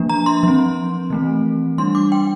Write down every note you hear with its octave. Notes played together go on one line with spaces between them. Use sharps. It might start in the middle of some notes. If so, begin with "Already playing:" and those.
Already playing: F3 A#3 D4
A#5
C6
F3 C4
E3 A3 C4
G3 D4 C6
D6
G5